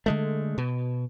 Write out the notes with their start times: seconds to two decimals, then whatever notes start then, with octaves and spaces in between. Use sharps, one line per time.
0.06 D3 G#3 A3
0.58 B2